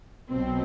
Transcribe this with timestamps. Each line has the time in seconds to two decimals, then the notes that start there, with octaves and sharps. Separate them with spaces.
0.30 B1 B2 F#3 C4